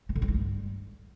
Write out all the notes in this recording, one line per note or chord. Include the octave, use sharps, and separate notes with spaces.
A3
D3
F#3
E3
G2